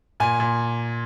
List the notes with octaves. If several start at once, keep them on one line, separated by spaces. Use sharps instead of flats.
A#2 G#5
A#2